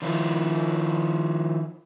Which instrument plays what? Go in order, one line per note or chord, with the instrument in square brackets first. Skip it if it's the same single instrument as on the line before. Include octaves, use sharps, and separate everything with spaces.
[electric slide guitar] D#3 F3 E4